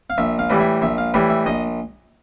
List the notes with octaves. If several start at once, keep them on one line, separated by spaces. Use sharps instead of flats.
F5
A#1 E5
F5
A2 E3 G3
E5
A#1 E5
F5
A2 E3 G3 E5
E5
A#1 D#5